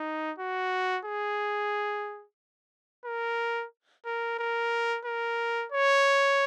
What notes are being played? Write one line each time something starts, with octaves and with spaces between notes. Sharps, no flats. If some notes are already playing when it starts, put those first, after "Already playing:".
Already playing: D#4
F#4
G#4
A#4
A#4
A#4
A#4
C#5